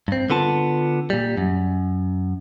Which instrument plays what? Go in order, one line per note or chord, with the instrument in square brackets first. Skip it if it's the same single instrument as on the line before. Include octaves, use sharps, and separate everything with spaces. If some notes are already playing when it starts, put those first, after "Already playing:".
[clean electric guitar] G2 C4
D3 B3 F4 A5
A#2 G3
F#2